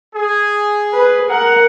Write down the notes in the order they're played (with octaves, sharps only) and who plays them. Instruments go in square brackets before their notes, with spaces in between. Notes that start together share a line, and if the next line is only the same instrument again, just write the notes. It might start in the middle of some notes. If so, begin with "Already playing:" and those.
[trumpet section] G#4
[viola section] B4
A#4 F#5